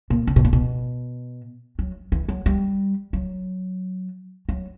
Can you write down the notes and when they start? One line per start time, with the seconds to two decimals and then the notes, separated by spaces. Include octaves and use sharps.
0.10 A#2
0.27 C#3
0.36 B2
0.44 A#2
0.53 B2
1.79 F#3
2.12 E3
2.28 F#3
2.46 G3
3.13 F#3
4.49 F#3